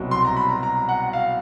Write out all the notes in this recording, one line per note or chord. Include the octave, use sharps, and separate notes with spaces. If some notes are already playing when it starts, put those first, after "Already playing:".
Already playing: C2 B2 F#3
C6
A#5
B5
A#5
A#5
F#5
F5